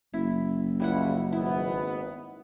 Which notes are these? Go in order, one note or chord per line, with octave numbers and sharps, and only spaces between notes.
F#1 E4
C#2 G3 E4 F#5
G#1 B3 E4